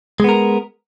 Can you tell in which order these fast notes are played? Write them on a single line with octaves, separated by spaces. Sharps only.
G#3 B3 A#4